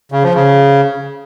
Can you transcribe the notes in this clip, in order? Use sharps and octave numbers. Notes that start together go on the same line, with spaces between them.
C#3
F3
C#3